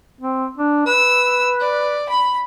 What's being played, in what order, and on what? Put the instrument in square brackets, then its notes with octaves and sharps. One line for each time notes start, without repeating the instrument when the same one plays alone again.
[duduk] C4
D4
[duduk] B4 [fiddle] E6
[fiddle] D5
B5